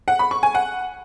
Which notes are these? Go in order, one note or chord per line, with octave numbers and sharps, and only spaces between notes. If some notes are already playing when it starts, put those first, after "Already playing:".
F#5
B5
C#6
G#5
F#5